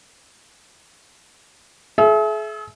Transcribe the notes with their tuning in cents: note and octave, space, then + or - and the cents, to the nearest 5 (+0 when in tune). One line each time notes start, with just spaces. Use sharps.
G#4 +45 E5 +5